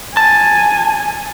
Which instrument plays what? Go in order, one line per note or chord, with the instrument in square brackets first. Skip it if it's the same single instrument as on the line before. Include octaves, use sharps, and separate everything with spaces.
[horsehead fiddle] G#5 [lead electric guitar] A5